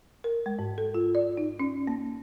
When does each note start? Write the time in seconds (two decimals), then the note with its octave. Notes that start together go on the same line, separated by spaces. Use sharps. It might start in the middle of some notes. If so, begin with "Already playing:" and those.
0.24 A#4
0.46 G#3
0.59 G#2
0.78 A4
0.94 F4
1.15 D5
1.37 D#4
1.60 C#4
1.87 A#3